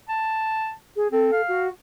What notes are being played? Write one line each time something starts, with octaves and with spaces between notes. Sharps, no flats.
A5
G#4
C4 A4
F5
F#4